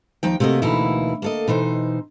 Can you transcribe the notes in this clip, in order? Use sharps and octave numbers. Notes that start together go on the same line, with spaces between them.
D#2 F3 D#4 G5
C3 A3 A#3 F#4 D#5
D2 B2 E3 A#3 D#4 E4
A#3 A4 D#5
B2 E3 D#4 C5